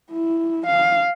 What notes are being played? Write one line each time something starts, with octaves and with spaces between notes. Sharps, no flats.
E4
F5